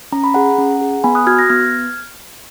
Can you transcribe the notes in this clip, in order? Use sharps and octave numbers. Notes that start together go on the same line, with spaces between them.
C#4 A#5
B5
G#4 F#5 A#5
C#4
G#4
B3 G#5 B5
D#6 F#6
F#4 F6 G#6
F#6 A#6
B3 F6 G#6